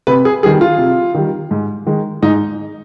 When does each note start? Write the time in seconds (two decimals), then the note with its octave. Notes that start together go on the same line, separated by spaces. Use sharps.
0.07 C3 B4
0.25 G#4
0.43 D#3 G3 G#4
0.61 F4
0.78 C3
1.14 D#3 G3
1.51 G#2
1.87 D#3 G#3
2.22 G#2 D#4